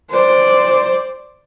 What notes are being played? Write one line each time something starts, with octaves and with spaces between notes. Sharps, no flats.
C5 D5